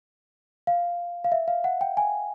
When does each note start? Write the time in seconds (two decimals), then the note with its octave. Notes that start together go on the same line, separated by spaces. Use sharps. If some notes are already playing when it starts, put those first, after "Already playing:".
0.67 F5
1.24 F5
1.32 E5
1.48 F5
1.64 F#5
1.81 G5
1.97 G#5